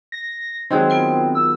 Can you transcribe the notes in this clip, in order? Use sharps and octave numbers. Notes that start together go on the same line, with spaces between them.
A#6
D#3 F#3 G#3 C4
B3 F4 A#4
E6